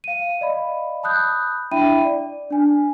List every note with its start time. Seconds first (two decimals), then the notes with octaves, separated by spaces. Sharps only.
0.04 F5 D#7
0.41 D5 D#5 F5 B5
1.03 A5 B5 D#6 F#6 G6
1.71 D4 E4 E5 G5 B5 D#7
2.05 D5
2.50 D4 G#5